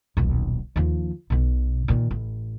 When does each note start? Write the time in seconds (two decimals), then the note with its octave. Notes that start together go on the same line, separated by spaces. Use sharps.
0.17 D#1 B1
0.76 D#2 F3
1.30 B1 B2
1.88 A#2 D#3
2.11 A1